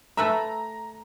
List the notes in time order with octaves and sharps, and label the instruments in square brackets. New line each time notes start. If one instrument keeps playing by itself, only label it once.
[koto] A3 B4 E5 [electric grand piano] A#5